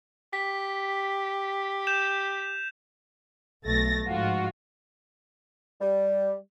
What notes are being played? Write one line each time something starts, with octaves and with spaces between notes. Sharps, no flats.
G4 B6
G6 E7 F7
B1 A3 A6 A#6
G#2 F3 F4 F#4
G3